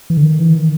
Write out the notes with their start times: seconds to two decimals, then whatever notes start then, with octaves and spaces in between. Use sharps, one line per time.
0.10 E3
0.17 D3
0.24 D#3
0.39 E3
0.55 D#3